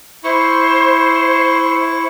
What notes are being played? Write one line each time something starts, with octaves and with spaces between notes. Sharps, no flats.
E4 C5 C#6